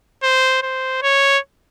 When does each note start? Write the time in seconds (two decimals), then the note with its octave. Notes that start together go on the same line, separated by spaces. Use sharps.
0.23 C5
0.62 C5
1.02 C#5